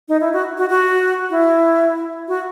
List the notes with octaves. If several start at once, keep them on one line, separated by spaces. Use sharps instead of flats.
D#4
E4
F#4
F#4
F#4
E4
F#4